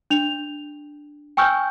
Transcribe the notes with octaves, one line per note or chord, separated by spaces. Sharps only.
D4 F7
G5 G#5 C#6 E6 F6 G6